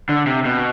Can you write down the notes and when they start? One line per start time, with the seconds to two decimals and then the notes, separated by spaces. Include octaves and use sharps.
0.09 D3
0.26 C3
0.45 B2